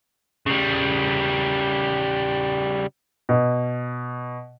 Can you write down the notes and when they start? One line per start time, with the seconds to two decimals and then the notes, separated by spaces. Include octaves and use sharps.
0.47 C#3 G3
3.29 B2